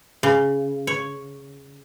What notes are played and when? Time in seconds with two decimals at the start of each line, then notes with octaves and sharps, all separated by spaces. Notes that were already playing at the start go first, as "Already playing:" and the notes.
0.23 C#3
0.87 C#5